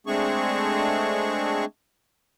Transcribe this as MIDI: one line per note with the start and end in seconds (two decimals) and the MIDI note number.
0.07 1.65 56
0.07 1.65 57
0.07 1.65 60
0.07 1.65 62
0.07 1.65 68
0.07 1.65 85